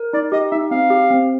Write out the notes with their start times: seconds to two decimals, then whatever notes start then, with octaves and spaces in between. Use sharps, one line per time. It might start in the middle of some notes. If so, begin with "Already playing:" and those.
Already playing: A#4
0.13 D#4 D5
0.32 G4 D#5
0.51 D#4 E5
0.71 C4 F5
0.90 G4
1.10 C4